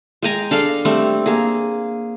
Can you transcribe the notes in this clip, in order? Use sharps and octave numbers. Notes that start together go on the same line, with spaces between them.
G#3 G5 G#5 A#5
D4 A4 F5
G3 A3 C4
A#3 G#4